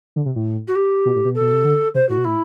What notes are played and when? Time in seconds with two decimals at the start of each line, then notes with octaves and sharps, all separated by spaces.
0.16 D3
0.26 C3
0.36 A2
0.68 F#4
0.75 G4
1.05 B2
1.16 A2
1.25 B2
1.35 A4
1.41 B2
1.52 C3
1.64 D3
1.94 C3 C5
2.09 A2 F#4
2.18 B2
2.25 A2 E4